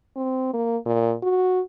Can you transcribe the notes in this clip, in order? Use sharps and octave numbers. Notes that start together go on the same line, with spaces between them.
C4
A#3
A#2
F#4